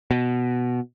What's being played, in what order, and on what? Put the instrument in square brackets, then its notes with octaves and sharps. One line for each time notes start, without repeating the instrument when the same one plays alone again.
[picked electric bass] B2